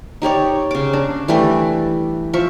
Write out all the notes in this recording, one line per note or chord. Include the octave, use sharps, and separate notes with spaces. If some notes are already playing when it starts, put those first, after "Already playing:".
D#4 G4 C#5 D5
C#3 D6
D4
E3 G3 A3 D5
F3 E5 C#6